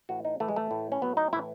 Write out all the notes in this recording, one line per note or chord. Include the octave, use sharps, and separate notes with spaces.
A2 E3 F#4
D#4
A2 E3 A3
G#3
A3
A2 E3
C#4
A2 F#3 B3
D#4
A2 E3 E4